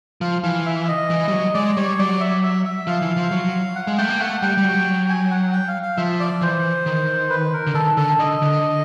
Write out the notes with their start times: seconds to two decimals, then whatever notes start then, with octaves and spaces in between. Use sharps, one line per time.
0.21 F3 F5
0.43 E3 F5
0.66 E5
0.88 D#5
1.10 E3
1.28 G3
1.32 F#3
1.54 G#3 D5
1.77 G3 C#5
1.98 F#3 D5
2.20 E5
2.43 E5
2.65 E5
2.87 F3 F5
3.02 E3
3.17 F3
3.31 F#3
3.76 F#5
3.87 G#3
3.98 A3 G5
4.09 A#3
4.20 A3 F#5
4.42 G3 G5
4.57 G3
4.64 F#3
5.10 G#5
5.31 F#5
5.53 G5
5.68 F5
5.83 F5
5.97 F3 E5
6.20 D5
6.41 E3 C5
6.86 D#3
7.30 B4
7.53 A#4
7.67 D3
7.74 D#3 A4
7.97 D3 A4
8.19 D3 D#5
8.42 D3